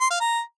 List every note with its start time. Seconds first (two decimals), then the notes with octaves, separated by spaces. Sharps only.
0.01 C6
0.11 F5
0.20 A#5